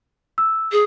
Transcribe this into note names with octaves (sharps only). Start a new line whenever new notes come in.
E6
G#4